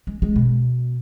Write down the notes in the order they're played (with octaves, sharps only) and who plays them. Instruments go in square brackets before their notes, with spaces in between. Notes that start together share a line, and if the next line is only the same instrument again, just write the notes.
[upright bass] G#3
G#3
B2